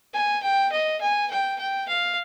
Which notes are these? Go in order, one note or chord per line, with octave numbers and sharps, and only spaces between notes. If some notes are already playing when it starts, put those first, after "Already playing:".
G#5
G5
D#5
G#5
G5
G5
F5